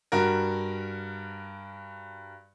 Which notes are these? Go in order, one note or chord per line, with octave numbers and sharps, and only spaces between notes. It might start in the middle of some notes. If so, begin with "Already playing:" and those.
G2 F#4 A#4